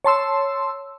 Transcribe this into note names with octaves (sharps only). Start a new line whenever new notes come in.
C#5 A5 C6 E6